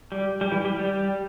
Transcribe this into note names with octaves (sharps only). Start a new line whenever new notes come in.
G3
G3
E3
G3
G3